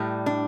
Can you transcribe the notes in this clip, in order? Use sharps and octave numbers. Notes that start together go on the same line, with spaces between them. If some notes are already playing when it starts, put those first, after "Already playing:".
Already playing: A2 G3
D4